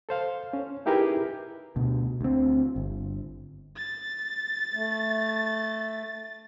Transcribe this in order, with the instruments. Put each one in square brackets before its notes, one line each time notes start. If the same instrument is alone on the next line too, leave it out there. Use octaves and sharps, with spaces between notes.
[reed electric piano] A4 C5 F5
C#4
D#4 E4 G4 G#4 A#4 B4
[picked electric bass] D2 B2
D2 C4
G1
[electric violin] A6
[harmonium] A3